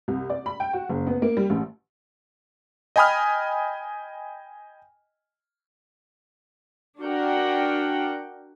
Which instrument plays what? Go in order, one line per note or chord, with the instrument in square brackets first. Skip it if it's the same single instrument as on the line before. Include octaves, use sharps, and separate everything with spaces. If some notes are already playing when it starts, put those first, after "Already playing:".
[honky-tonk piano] C2
D5
B5
G5
F#4
F#1
B3
A#3
G3
A1
[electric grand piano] D#5 G5 G#5 B5 D#6 F6
[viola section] D4 F#4 A#4 F#5 G5